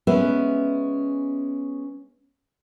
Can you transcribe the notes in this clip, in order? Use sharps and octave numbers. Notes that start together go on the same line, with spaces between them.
G#3 B3 C#4 B4 E5